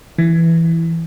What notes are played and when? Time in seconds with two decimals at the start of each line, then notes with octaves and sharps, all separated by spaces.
0.18 E3